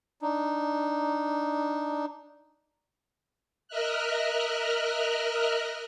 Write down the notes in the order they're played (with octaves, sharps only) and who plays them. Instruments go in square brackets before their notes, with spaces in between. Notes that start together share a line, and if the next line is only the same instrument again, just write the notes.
[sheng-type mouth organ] D4 D#4
[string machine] A#4 D#5 E5 F6 F#6